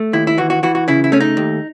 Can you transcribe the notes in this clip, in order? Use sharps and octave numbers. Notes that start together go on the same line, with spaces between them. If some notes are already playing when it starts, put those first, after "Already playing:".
Already playing: A3
D#2 E4
E4
E3 F#4
F#4
E3 F#4
F#4
C#3 E4
E4
A3 C#4
D#4
D#2